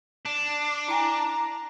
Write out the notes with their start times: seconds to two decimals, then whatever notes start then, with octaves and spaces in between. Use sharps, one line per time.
0.25 D4
0.88 E4 G5 G#5 A#5